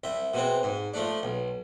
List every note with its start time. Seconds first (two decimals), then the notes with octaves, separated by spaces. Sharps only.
0.04 C2 E5
0.34 B2 G#3 C4
0.63 G#2
0.94 F3 A3 D4
1.23 B1